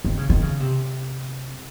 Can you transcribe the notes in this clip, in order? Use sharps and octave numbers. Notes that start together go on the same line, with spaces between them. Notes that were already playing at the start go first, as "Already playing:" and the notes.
D#3
C#3
D#3
C#3
C3